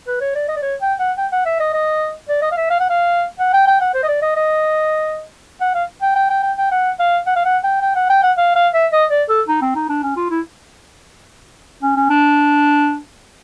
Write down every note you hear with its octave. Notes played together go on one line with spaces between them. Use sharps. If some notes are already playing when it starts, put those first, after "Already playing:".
B4
C#5
D5
D#5
D5
C#5
G5
F#5
G5
F#5
E5
D#5
D#5
D5
D#5
F5
E5
F5
F#5
F5
F#5
G5
G5
F#5
C5
D#5
D5
D#5
D#5
F#5
F5
G5
G5
G5
G5
G5
F#5
F5
F#5
F5
F#5
G5
G5
F#5
G5
F#5
F5
F5
E5
D#5
D5
A4
D#4
C4
D#4
D4
C#4
F4
E4
C#4
C#4
D4